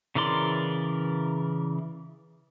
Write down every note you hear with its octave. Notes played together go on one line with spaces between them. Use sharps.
C#3 E3 A#4 D5 C6